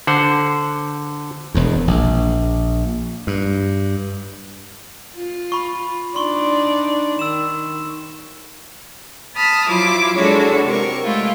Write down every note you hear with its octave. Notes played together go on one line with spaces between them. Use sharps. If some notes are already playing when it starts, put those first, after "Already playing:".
D3 C5 F#5
E1 E2
A#1
G2
F4
B5 C#6
D4 D#4 D5 C6 C#6
D#3 E6 E7
A5 B5 D#6 F6
F3 F#3 E4 F4 D6
G#3 D4 E4 F#4 A4 C#5
C3 A#4 C#6
G#3 A3 E4 F4 G5